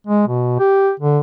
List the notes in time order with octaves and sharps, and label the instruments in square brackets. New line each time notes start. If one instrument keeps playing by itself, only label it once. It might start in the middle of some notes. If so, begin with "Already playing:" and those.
[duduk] G#3
B2
G4
D3